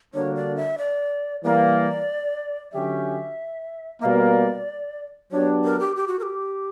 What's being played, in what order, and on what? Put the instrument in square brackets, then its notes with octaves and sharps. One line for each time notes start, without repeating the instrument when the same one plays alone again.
[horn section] D3 G3 A#3 D4 F#4 [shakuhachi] C#5
[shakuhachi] D5
E5
D5
[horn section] E3 G3 A#3 [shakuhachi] D5
[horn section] D3 F#3 C#4 G4 [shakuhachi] E5
[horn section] B2 G3 A#3 [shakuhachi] D5 E5
[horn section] F#3 B3 D4 G4 [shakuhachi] C#5
[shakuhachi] A#4
G4
G4
F#4
A#4
G4